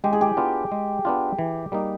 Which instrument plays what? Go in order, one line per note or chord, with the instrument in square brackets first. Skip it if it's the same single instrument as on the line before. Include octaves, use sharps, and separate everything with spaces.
[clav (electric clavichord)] G#3 [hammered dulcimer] G4
[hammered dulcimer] G#4
G4
[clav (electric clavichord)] B3 D4 F4
G#3
B3 D4 F4
E3
G3 A#3 D#4